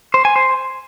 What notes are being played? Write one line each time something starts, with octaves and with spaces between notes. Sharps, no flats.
C5
G#5
C5